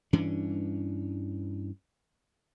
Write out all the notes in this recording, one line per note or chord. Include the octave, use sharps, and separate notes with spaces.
G2 E3 C#4 D4